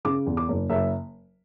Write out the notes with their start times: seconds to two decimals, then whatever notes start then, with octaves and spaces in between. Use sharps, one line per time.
0.05 C#3 D6
0.26 E2
0.37 D6
0.48 F#1
0.70 F#1 E5